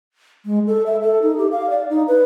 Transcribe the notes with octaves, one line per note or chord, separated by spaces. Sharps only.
G#3
A4
E5
A4
D#4
G4
F5
D5
D#4
B4